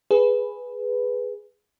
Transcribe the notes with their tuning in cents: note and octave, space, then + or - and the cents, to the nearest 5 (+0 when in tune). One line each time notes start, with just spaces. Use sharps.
G#4 +0 B4 +0